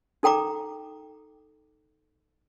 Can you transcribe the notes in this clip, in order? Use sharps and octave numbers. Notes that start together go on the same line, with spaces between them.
D#4 A4 G5 A#5 D6